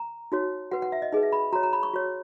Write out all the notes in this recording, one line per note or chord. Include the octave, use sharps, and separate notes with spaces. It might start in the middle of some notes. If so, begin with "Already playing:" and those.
Already playing: A#5
D#4 F#4 C#5
F#4 B4 F#5
F#5
E5
D#5
D#4 G#4 B4 D#5
E5
B5
F#4 C#5 A#5
A#5
B5
C#6
F#4 C#5